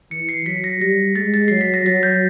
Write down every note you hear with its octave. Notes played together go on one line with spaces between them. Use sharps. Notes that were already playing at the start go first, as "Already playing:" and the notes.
E3 C#7
C7
F#3 B6
A#6
G3 A#6
G#3 A6
A6
F#3 C7
B6
A#6
F#3 A6
G6